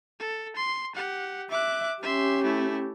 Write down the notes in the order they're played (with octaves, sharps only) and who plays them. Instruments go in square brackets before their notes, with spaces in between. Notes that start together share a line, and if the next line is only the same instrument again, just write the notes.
[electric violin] A4
C6
G4 F#5
[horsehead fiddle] E5 [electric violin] D6 F#6
[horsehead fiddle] C#4 G4 [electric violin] E5 C6
[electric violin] A3 E4